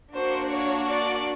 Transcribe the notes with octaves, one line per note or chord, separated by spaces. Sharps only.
A#3 D4 F#4 C5
C#5
D5